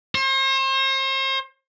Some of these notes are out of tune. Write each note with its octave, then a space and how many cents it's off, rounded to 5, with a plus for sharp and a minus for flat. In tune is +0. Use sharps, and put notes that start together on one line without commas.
C5 +40